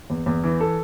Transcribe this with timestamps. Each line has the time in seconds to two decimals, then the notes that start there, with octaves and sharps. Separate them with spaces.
0.10 E2
0.26 E2
0.43 E3
0.61 A4